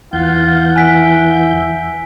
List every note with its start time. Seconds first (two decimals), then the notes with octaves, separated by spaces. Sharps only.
0.13 E2 E3 F4 F#5 G6
0.76 E5 G#5 B6 D7